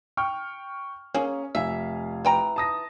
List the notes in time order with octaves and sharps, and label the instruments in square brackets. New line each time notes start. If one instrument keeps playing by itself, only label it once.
[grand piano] G5 C#6 F6
[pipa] A#3 G#4 [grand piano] C#4
[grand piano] F1 F5 G#5 [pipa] E5
[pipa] E3 G5 A#5
[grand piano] A5 D#6 A#6